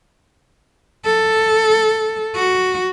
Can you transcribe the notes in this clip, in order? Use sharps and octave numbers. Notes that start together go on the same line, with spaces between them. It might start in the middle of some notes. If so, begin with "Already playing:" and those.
A4
F#4